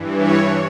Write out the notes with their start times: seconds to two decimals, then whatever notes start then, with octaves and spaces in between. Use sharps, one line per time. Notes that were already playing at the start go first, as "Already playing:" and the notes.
Already playing: G2 E3
0.17 C#5